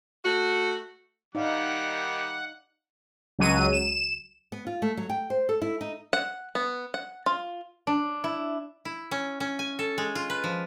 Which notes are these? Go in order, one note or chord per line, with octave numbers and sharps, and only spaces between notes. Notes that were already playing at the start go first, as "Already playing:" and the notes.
A3 F#4
D#3 G3 D#4 D5 F5 F#5 D6
C#2 F#3 D#7
E7
B3
F4
A3
F#3
G5
C5
A4
E4
D#4
F#5
B3
F#5
F4
D4
E4
E4
C#4
C#4
G#5
A4
G#3
F4
B4
F3